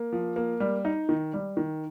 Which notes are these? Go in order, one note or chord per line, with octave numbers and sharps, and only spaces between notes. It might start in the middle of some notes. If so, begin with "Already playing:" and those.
Already playing: A#3
F3
A#3
G3
D#4
D#3
G3
D#3